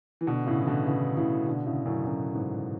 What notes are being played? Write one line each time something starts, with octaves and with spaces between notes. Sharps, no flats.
E3
B2 D3
A2 C#3
E3
B2 D3
C#3 E3
A2 C#3
B2 D3
A2 C#3
F#2 A2
F#2 A2
G#2